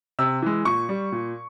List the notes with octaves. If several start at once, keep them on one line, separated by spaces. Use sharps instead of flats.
C3 E6
E3 G#3
A#2 C#6
G3
A#2